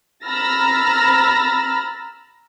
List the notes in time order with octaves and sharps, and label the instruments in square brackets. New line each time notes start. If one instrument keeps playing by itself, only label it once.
[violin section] A#5 B5 E6 F6 A6 A#6